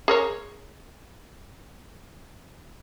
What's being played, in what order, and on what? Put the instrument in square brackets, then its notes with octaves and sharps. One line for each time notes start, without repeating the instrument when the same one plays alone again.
[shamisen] G#4 A#4 C#5